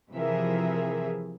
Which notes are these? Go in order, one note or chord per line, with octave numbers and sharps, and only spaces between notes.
C3 E3 F3 G#4 A#4 E5